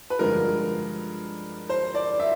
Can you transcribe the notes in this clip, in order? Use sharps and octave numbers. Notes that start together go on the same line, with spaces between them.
B4
G2 D3 F3 G#3 A#4
C5
D5
E5